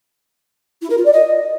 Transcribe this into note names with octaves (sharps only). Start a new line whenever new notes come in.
E4
A#4
F4
D5
D#5